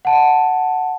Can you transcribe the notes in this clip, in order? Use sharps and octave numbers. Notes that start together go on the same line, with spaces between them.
F#5 A5